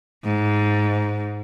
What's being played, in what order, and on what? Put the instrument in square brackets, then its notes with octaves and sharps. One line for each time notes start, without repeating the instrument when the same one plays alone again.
[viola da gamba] G#2